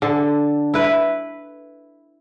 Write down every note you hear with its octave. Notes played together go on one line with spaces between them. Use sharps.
D3 A4
E4 B4